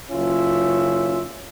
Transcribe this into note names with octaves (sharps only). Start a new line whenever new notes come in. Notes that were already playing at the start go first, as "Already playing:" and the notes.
F#1 C#4 F4 E5